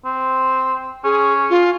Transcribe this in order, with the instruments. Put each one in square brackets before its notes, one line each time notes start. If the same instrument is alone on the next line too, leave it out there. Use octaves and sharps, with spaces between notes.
[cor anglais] C4
[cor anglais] C#4 [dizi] G#4
[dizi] F4